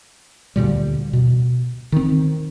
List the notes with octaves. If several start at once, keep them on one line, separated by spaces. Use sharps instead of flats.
D2 A#2 G3
B2
D#3 C4